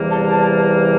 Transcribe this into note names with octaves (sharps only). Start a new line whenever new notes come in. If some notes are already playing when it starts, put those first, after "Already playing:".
Already playing: E2 C3 E3 G3 A#3
A5
A5